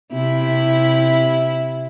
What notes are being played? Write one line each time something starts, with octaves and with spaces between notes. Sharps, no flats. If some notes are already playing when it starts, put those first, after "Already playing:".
C3 E4